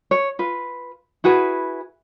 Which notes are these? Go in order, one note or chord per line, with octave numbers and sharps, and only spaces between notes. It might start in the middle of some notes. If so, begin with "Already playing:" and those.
C#5
F4 B4
E4 F#4 G#4 B4